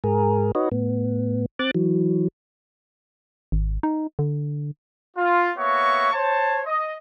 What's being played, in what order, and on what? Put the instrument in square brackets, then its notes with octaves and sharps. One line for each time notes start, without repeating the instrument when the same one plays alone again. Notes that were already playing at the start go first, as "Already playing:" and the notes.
[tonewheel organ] G#2 G#4 A#4
D#4 F#4 B4 C#5 D#5
A2 B3
C4 D6 F#6 A6
E3 F#3
[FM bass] G#1
D#4
D3
[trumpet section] F4
A#3 B3 F#4 C#5 E5 C#6
C5 C#5 A5
D#5